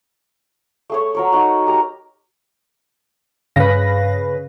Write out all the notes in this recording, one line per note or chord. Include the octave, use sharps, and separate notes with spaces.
A3 G#4 C#5
F#3 A#4 C#5
D#4 F#4
G4 A#4 A#5
G2 C#3 B4 F5 A#6